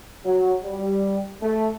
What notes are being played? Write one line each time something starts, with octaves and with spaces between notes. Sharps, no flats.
F#3
G3
A3